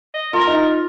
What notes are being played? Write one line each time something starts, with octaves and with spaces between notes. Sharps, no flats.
D#5
F4 A#4
D#4